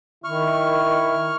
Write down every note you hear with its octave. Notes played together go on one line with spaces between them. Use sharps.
D#3 E4 C#6 F6